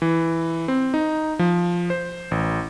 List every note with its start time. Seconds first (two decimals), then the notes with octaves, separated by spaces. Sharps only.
0.02 E3
0.68 C4
0.94 D#4
1.39 F3
1.90 C5
2.31 A1